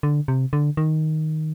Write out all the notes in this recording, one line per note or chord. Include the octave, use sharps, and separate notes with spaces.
D3
C3
D3
D#3